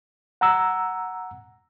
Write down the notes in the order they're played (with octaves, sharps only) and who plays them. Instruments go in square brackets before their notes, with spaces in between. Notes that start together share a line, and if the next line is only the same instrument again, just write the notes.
[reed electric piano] F#5 A#5 E6